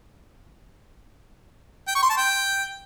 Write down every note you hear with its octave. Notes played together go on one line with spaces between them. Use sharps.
G5
C#6
C6
A5
G5